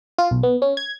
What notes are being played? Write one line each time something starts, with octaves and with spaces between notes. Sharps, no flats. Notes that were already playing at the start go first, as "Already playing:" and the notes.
F4
B1
B3
C#4
G#6